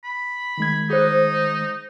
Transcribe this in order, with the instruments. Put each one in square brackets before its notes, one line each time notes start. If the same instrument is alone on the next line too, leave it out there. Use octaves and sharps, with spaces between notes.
[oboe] B5
[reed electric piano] D#3 G#3 G#6
[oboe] D#4 [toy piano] G#4 C5